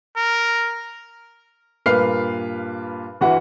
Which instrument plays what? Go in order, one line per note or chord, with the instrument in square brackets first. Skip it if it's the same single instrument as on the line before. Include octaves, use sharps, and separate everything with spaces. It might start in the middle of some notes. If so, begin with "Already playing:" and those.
[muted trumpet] A#4
[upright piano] G2 A#2 A#4 B4 F6 C7
G1 E3 F#4 B4 F#5